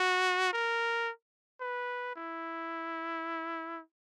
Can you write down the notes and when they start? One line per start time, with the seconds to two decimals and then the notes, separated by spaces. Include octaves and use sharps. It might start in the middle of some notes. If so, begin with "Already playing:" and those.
Already playing: F#4
0.53 A#4
1.61 B4
2.16 E4